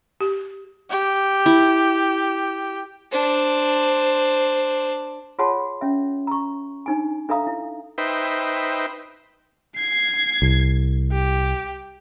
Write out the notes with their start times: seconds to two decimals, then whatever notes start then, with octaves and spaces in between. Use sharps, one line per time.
0.20 G4
0.90 G4
1.46 E4
3.12 D4 C5
5.39 F4 G#4 C#5 F#5 A5 C6
5.81 C#4 E5
6.27 A#5 C#6
6.86 D4 D#4 G#5
7.29 D4 A4 E5 F5 A#5 D#6
7.47 E4
7.98 D#4 B4 C5 E5 G5
9.75 G#6 C7
10.42 C2
11.12 G4